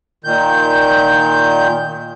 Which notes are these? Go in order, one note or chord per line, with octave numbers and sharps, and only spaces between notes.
A#2 D#3 G6